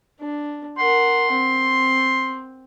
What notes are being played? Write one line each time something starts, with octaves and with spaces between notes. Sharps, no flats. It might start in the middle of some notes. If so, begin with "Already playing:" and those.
D4
A#4 F#5 C6
C4